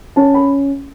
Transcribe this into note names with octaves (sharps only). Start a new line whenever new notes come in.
C#4 A5
B5